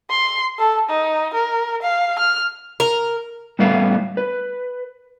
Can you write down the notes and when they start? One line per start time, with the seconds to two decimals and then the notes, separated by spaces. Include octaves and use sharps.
0.10 C6
0.59 A4
0.89 D#4
1.34 A#4
1.82 F5
2.19 F6
2.80 A#4
3.59 A2 G3 B3 A4 B4 F5
4.17 B4